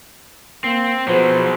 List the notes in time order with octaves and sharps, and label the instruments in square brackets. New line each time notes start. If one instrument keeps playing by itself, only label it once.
[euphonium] A#3 [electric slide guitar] C4
[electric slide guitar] B2 F#3 [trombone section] F3 G#4 C5 [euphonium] B3